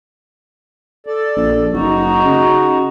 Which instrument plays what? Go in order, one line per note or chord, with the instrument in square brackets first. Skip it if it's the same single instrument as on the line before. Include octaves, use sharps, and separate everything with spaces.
[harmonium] A4 D5
[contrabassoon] A#1
[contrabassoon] F#1 [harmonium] D#4 F#4
[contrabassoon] C#3